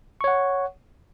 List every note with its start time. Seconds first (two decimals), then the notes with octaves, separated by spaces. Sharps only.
0.21 C#6
0.24 C#5
0.28 F#5